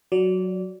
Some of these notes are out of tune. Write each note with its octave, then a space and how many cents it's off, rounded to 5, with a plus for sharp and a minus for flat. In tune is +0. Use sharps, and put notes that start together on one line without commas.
F#3 +0 D5 -20